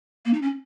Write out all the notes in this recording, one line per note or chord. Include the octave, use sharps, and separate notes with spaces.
A#3
D#4
C#4